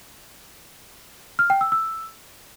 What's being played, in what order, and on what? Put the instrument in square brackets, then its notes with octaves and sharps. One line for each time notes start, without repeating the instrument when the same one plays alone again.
[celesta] F6
G5
E6
E6